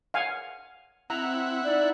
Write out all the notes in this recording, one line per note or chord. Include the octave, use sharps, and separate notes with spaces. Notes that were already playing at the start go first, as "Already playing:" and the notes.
F5 F#5 G#5
C4 E4 F#5 A#5
D#4 D5